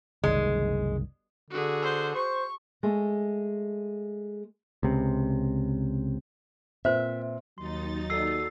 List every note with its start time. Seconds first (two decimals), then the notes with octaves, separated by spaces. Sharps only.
0.24 F#1 C2 D#3 G#3
1.50 D3 F#4 G#4
1.82 C5
2.15 C5 C#6
2.83 G#3 A3
4.83 C#2 C3
6.85 A#2 C4 B4 C5 E5
7.58 D#2 F#3 D#4 C6 A6
8.10 F#4 A4 D5 E6 C7